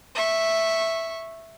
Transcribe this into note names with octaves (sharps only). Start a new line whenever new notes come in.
E5 C#6